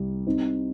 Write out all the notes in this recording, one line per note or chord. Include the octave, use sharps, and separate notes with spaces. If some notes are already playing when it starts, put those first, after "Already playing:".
Already playing: C2 G3
C4 D#4